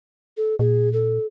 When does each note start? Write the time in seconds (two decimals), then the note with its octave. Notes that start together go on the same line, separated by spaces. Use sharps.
0.37 A4
0.59 A#2 G#4
0.93 A4